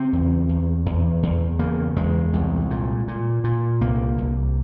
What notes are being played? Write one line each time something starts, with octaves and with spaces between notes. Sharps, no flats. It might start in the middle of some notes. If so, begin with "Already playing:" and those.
Already playing: C#3 C4
E2
E2
E2
E2
C#3 A#3
E2 G#3
C2
A#2
A#2
A#2
C2 A#3
C2